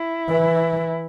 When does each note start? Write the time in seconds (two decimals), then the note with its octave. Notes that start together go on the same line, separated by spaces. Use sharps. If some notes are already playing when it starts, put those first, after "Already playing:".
Already playing: E4
0.29 E3